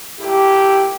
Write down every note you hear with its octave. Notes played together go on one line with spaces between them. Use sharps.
A#2 A3 E4 G4